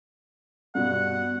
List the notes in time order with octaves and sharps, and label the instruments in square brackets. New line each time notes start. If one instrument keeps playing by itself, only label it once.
[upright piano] G2 B2 [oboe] F#5